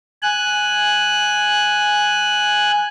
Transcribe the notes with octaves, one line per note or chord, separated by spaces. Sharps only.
G#5 F#6